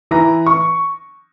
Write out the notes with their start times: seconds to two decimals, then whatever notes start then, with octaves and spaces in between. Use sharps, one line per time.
0.11 E3 A#5
0.46 C#6